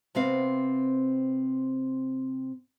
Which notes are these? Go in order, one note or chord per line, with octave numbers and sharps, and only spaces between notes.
C3 B3 C4 F5